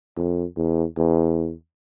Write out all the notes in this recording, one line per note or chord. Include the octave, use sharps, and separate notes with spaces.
F2
E2
E2